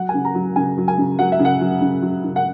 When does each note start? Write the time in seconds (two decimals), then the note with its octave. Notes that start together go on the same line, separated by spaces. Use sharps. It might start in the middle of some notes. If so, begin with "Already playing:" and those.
Already playing: F#3 F#5
0.09 G#5
0.14 C#3
0.25 A#5
0.35 F#3
0.56 C#3 G#5
0.78 F#3
0.88 G#5
0.98 C#3
1.19 F#3 F#5
1.32 E5
1.39 C#3
1.45 F#5
1.61 F#3
1.81 C#3
2.02 F#3
2.24 C#3
2.36 F#5